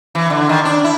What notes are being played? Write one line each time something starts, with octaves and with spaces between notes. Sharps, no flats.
E3
D3
D#3
D4
E4